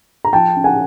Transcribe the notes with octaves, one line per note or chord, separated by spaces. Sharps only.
A#5
F3 G5 A5
C#4
F#5 G#5